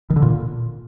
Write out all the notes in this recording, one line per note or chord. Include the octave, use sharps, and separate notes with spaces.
D#3
D3
A#2